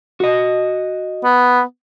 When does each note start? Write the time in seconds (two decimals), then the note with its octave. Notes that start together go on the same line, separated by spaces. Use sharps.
0.20 F#4 D#5
1.24 B3